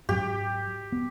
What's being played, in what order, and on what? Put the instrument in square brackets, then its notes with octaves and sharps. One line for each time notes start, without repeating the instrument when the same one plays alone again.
[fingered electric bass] G#2 F#3 [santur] G4
[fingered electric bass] B3